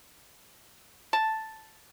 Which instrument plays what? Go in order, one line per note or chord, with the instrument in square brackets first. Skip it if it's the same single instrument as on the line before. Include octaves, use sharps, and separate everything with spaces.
[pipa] A5